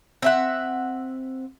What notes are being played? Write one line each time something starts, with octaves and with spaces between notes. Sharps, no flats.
C4 E5 F#5